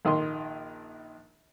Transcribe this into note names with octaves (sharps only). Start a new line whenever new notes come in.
A#1 D#3 D#5 C6